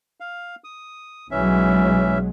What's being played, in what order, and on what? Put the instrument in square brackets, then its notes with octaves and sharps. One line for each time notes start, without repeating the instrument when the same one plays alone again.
[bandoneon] F5
D#6
[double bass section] B1 F#3 G#3 [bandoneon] E3 C#4 E5